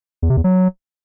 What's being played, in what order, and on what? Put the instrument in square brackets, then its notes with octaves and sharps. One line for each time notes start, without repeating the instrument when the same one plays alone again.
[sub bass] E2
C3
E2
F#3